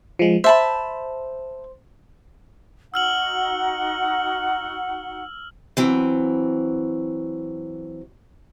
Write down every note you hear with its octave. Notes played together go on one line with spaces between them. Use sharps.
F3 G#3
C5 E5 A5 B5
D#4 F#4 F#5 E6 F6 F#7
E3 F#3 C4